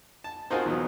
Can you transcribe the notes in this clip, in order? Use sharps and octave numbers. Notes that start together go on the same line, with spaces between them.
A5
C4 D#4 F4 F#4 G#4 A#4
E2 B2 F#3